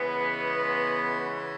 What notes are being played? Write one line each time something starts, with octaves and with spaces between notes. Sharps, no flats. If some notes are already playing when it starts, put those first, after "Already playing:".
Already playing: C#3 E3 G#3 B3